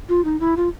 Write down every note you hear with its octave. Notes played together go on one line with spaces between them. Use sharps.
F4
D#4
E4
F4